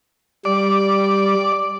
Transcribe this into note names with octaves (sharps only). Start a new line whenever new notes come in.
G3 D5